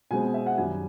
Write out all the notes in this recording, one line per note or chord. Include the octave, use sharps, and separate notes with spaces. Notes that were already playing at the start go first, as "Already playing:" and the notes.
B2 G#3 C4 G#5
E5
F#5
F#2 D#3 G3 G#5